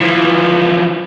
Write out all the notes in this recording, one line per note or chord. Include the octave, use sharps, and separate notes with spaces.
E3 F3